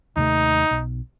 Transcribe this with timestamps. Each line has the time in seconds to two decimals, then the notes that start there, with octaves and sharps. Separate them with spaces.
0.17 D#2 C3 A3 D#4
0.71 B1